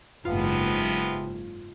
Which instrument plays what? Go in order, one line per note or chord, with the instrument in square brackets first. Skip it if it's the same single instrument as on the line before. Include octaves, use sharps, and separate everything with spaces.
[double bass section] F#1 G#2 [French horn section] C3 F3 B3 [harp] F4